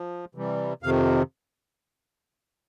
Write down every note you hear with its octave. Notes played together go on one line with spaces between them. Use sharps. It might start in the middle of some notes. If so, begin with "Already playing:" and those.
Already playing: F3
C3 E3 G3
F2 C3 D#3 F5